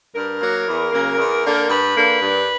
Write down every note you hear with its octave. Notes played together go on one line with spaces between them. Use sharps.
G2 A#4
F#3 A#3
E2
C#3 F#3 A#3
E2
D3 A#3
G2 B4
D3 A#3
G2